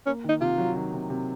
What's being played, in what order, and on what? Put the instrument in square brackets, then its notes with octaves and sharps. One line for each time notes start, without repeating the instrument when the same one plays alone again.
[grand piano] A#3 [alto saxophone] C#4
[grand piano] D#3 [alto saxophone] D#4
[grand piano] C3 [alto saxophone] F4
[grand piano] F#3
D#3
C3
C3